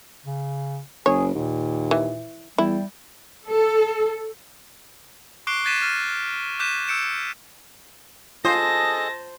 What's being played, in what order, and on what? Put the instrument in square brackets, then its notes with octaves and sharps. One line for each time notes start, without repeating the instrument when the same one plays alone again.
[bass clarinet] C#3
[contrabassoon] F#1 [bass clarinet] G#4 [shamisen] C#5
[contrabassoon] D#2 [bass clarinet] A#2
[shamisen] E3
[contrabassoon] E2 [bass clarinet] G3 [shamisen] E4
[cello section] A4
[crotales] C#6 D6 F#6 C7 D7 G7
F#6 G#6 A6 B6 D#7 E7
F6 A6 D#7
F6
D6 F#6 G6 B6 D#7 E7
E6 G6 C#7 D7 E7
[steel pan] F4 D#6 [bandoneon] G#4 A4 D#5 [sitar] C5 [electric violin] A5 A#6